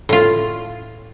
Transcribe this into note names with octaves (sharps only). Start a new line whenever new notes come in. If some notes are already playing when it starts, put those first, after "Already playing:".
A2 F4